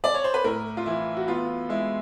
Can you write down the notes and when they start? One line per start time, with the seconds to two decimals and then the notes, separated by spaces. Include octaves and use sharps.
0.04 D5
0.14 C#5
0.24 C5
0.34 B4
0.44 A2 A#4
0.77 F4
0.86 E3 E4
1.17 F#4
1.27 B3 F4
1.69 G#3 E4